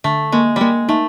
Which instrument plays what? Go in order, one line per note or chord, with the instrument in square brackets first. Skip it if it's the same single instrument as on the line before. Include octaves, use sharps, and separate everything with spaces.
[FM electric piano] D3 [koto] A3
[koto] G#3 [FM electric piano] A#3
[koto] G3 G#3 [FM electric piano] A#3
[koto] A3 [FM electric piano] D#4